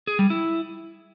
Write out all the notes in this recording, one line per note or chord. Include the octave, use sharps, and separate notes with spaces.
G#4
G3
E4